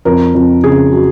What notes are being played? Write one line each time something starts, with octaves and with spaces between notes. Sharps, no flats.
F2 A#4
F2
C#3 G#4
F#3